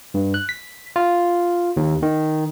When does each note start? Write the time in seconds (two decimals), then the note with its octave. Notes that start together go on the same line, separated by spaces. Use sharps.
0.14 G2
0.34 F#6
0.49 B6
0.96 F4
1.77 D#2
2.03 D#3